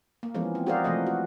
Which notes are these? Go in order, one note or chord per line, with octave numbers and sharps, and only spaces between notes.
A#3
E3 F3 G#3 B3 C#4
C4
F#4 G#4 A#4 C5 D5 F5
C3 E3 F3 A3 D#5
F#4